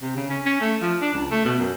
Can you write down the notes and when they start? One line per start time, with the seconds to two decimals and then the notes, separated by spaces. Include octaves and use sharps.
0.02 C3
0.16 C#3
0.30 C#4
0.46 C#4
0.61 A3
0.81 F3
1.01 D4
1.14 C#2
1.31 A3
1.45 B2
1.59 F#2